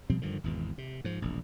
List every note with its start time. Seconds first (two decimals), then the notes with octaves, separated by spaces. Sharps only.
0.10 B2 F3 G3 C4
0.22 G2 D3 D#3 F3
0.44 G#1 E2 B2
0.78 C3
1.04 G#2 F3
1.22 E1 A#1